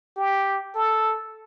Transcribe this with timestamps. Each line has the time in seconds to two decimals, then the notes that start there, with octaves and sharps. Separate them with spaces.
0.16 G4
0.74 A4